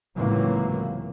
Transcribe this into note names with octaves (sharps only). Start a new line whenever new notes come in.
C#2 A2 C3 E3 F#3 A#3